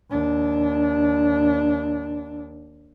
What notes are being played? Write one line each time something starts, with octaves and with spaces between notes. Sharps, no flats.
D#2 D4